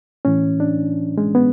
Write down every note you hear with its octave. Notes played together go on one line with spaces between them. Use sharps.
A2 E3 C#4
D4
G#3
B3